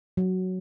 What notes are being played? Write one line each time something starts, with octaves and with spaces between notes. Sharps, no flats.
F#3